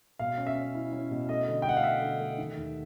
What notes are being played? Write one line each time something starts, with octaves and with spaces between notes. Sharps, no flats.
B2 F5
C#4
E5
C#4
E4
C#4
B2
A3 D#5
D3
G5
A3 F#5
F5
A3 E5
D3
A3
D#3
D#2